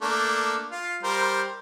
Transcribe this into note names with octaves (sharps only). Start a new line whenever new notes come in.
A3 A#3 D4
F4 F5
G3 A#4 C5